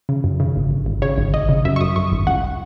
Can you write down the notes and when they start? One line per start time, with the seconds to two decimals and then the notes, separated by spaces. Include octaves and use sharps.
0.09 C#3
0.24 F#2
0.40 C#3
0.56 G#1
0.71 G#1
0.86 G#1
1.02 C#3 C#5
1.18 G#1
1.34 G#1 D#5
1.49 C#3
1.65 F#2 E5
1.76 C#6
1.81 F#2 D#6
1.96 F#2 C#6
2.12 G#1
2.27 C#2 F#5